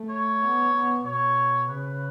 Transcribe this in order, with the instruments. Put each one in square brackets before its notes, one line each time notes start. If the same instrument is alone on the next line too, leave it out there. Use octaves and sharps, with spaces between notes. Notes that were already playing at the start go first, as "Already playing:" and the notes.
Already playing: [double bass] A3
[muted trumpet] C#5
[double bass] B3
B3
[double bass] B2 [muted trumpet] C#5
[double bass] C#3 [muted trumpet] B4